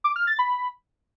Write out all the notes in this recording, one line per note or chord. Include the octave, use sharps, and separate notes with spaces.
D6
F6
A6
B5